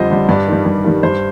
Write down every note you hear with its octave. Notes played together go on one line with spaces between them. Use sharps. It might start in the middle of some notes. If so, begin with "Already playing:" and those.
Already playing: F2 D3 G3 C5 D#5
D3 G3
G2 D5
D#3 G3
G2
D#3 G3
G2 C5